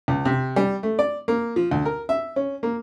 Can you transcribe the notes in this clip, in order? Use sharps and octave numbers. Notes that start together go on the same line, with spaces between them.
C#2
C3
G3
A3
D5
A#3
F3
D2
A#4
E5
C#4
A#3